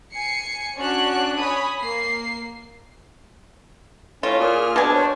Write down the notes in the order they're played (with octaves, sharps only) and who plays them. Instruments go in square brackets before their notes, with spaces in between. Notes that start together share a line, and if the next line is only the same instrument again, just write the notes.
[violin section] G#5 C7 C#7
C#4 D4 F#4 C#5 F#6
C#5 G#5 B5 D#6
A#3 C7
[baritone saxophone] A2 [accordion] C#4 [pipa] F4
[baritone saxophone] A#2 [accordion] G#4 F6
[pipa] B2 G#5 [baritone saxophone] D4
[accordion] C5 C#5